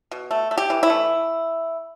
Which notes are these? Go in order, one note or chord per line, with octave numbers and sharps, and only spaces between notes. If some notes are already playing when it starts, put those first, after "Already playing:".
B2
A3
A3
G4
E3
E4
A3